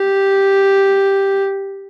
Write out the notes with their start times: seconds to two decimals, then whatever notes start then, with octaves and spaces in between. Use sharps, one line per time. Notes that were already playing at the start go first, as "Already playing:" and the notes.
Already playing: G4